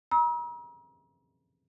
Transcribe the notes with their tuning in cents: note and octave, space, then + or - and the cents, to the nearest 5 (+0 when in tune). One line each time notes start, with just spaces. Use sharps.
A#5 +40 E6 -40